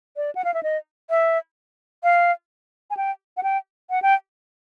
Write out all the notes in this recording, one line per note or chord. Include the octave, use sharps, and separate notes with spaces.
D5
F#5
F5
E5
D#5
E5
F5
G#5
G5
F#5
G5
F#5
G5